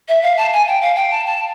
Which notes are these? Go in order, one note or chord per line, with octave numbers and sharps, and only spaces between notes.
E5
F5
A5
G#5
G5
F5
G5
A5
A5